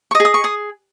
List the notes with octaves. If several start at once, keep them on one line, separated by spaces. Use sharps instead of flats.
C#6
D#5 D#6
G#4
D#6
C#6
G#4 D#6